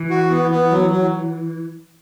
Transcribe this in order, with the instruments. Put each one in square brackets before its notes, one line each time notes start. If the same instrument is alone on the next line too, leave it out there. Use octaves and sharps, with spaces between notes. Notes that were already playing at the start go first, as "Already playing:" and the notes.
Already playing: [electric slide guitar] E3
[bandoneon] F#4
B3
B3
F#3
F#3